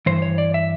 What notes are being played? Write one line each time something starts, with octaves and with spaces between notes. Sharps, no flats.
G2 E3 C5
C#5
D5
E5